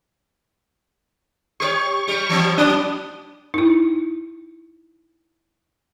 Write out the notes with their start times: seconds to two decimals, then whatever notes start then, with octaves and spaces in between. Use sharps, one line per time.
1.60 G4 A#4 C#5 C#6
2.08 G3 G4
2.29 E3 F#3 C4
2.58 F#3 D4 D#6
3.54 D#4 E4